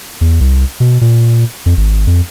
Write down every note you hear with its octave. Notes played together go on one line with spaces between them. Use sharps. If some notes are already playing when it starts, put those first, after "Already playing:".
E2
C2
B2
A#2
F2
G#1
F2